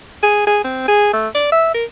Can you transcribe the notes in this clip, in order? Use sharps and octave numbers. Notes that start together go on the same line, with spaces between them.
G#4
G#4
C4
G#4
A3
D5
E5
A#4